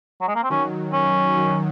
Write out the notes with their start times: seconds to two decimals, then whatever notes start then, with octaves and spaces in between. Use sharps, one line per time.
0.21 F#3
0.28 G#3
0.36 A#3
0.43 C4
0.50 D#3 F#3 C#4
0.93 C#4
1.36 D#3 F#3